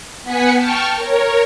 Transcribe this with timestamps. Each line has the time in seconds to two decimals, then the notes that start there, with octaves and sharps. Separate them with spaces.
0.23 B3 F#5 G#5 B6 C#7
0.54 G5 A5 C#6 F6
0.96 A#4 C#5